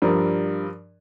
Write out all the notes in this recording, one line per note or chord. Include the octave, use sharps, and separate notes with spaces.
G2 F3 D4 A#4